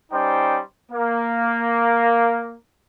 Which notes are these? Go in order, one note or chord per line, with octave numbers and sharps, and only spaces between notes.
G3 C#4 D#4 C5 D5 G5
A#3